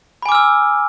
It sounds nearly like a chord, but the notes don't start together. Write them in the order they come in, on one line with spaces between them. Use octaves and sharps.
B5 G#5 D6 F6 E6